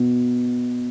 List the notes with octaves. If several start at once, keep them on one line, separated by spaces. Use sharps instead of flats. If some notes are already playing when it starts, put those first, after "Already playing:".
Already playing: B2